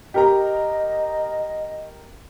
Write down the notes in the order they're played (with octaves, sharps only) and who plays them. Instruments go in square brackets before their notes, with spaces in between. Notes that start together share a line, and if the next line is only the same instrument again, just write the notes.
[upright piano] G4 A#4 A#5 [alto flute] D#5